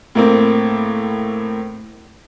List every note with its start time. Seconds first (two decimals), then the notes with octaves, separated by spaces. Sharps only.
0.15 A2 A#3 C4